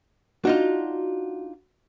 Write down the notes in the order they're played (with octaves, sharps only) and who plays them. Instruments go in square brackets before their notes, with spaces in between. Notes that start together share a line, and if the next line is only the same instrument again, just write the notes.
[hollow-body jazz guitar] D4 D#4 F4 [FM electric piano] F#4